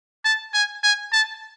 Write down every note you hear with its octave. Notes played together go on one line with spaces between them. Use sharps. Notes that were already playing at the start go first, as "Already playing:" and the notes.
A5
G#5
G#5
A5